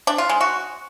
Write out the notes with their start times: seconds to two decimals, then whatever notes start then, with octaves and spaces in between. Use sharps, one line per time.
0.07 D4
0.18 F4
0.29 G#3
0.41 F#4